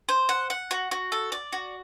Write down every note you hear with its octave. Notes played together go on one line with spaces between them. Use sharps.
C5
F#5
F#5
F#4
F#4
A4
D5
F#4